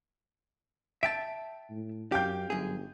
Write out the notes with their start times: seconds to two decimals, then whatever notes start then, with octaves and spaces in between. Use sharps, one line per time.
1.03 E5 G5 A5 D7
1.71 A2
2.12 F#2 G4 F5 G5 G6
2.50 G1 F#2 G#4